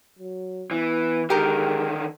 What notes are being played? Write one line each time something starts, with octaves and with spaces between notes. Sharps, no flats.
F#3
E3 B3
D3 D#3 G#3 G4 A#4